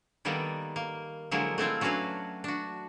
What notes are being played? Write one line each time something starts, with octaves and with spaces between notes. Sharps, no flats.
D#3 G3 A#3 B3 A4
A#3
D3 F3 F#3 G#3 A#3 E4
A3 C4 E4 F4
F#3 C#4 D4 F#4 B4 F5
D4 F#4